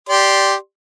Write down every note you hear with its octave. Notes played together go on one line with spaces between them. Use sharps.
G4 D5 C6